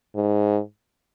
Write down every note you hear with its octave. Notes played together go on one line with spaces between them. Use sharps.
G#2